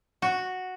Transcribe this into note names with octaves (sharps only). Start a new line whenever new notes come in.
F#4